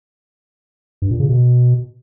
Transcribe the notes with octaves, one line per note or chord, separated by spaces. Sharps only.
G2
A#2
C#3
B2